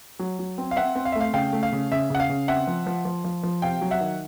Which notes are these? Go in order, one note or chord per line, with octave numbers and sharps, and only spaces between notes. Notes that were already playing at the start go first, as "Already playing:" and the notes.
F#3
F#3
C4
F5
C4 E5 F#5
C4
F5
E5
A3
F5
C#3 F5 G5
A3
F5
C#3
C#3 E5
C#3 F#5
F5
C#3
C4 E5 F#5
F3
F3
F3
F3
F3
C3 F5 G5
F#3
E5 F#5
D#3